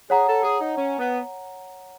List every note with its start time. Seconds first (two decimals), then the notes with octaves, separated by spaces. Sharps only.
0.10 G#4 C#5 F#5 A#5
0.27 A4
0.43 G#4
0.59 D#4
0.77 C#4
0.98 B3